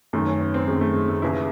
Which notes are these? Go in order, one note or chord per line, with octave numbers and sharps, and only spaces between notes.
F#2 D#3 A3
C#4
C#4
C4
F#2 D#3 G#3
A3
G#3
A3
D#2 C#3 E3 E4